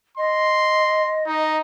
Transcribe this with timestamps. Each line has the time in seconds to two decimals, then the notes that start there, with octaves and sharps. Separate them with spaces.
0.18 D#5 C6
1.26 D#4